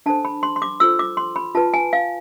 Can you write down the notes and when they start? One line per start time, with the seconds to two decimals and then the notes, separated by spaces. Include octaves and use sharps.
0.06 D4 A4 C5 A5
0.25 B5
0.43 C6
0.56 C6
0.62 D6
0.80 F4 A4 C5 E6
0.99 D6
1.17 C6
1.36 B5
1.55 F4 B4 A5
1.74 G#5
1.93 F5